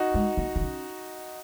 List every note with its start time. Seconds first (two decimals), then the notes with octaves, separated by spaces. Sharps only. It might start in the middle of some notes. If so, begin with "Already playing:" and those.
Already playing: D#4 F#4
0.14 G#3
0.37 A#3
0.56 C4
0.61 C#4